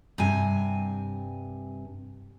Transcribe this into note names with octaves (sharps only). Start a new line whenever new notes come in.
G2 C3 G#5